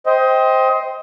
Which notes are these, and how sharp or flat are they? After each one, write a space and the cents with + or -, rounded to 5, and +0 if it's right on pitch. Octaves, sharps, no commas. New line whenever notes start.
C5 +0 D#5 +25 G5 +0